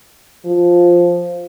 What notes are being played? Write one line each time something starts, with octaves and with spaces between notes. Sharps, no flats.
F3